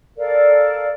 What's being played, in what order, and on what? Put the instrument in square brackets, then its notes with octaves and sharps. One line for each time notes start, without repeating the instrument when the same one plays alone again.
[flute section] A4 A#4 D5 F5